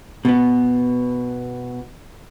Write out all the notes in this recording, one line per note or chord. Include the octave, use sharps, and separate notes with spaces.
B2 B3